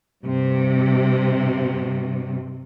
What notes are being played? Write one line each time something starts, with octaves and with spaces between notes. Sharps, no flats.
G2 C3